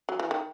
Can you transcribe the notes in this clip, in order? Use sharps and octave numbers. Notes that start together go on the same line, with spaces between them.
F#3
E3
D#3